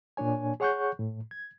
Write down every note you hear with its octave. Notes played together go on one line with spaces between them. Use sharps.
A#2 A#3 D4 C#5 G#5
G#4 C#5 F#5 C#6 F#6 G6
A2
G#6